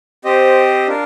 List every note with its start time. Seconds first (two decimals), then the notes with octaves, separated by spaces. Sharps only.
0.25 C4 G4 C5 D#5
0.87 D4 F4 A#4